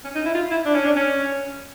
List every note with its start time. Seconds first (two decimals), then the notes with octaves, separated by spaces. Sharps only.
0.04 C#4
0.15 D#4
0.25 E4
0.35 F4
0.51 E4
0.65 D4
0.74 C#4
0.85 D4
0.96 C#4